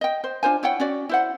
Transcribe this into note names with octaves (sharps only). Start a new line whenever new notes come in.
D#5 G5
C5
D4 F4 C5 G#5
E4 C#5 F#5 G5
C#4 F#4 D5
E4 C5 F#5